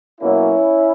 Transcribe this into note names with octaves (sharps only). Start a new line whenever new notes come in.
B2 F#3 A#3 C#4 E4